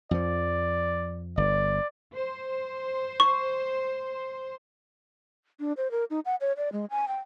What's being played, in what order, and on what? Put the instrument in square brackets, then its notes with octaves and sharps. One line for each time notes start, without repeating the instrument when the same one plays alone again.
[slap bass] F2 F3 [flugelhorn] D5
[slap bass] G1 [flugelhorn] D5
[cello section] C5
[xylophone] C#6
[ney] D4
C5
A#4
D#4
F#5
C#5
D5
G#3
G#5
G5